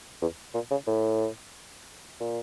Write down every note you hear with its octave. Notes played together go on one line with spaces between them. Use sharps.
E2
A#2
C#3
A2
A#2